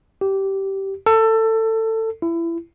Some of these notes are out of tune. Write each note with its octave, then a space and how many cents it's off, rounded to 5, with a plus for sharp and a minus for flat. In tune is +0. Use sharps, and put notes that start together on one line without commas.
G4 -15
A4 +20
E4 +25